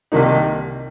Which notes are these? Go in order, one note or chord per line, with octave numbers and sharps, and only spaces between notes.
C2 C3 D#3 A#3 D#4